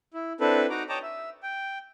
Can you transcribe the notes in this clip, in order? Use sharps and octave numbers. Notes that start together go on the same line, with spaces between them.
E4
C4 D4 E4 A4 B4
D#4 F#4 A#5 D6
C#5 D#5 G5 A5 A#5 D6
E5
G5